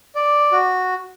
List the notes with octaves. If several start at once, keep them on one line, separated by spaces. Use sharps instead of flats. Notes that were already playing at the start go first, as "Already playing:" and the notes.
D5
F#4